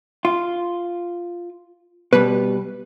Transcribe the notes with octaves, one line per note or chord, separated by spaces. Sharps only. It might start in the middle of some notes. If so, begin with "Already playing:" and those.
F4
B2 G3 B4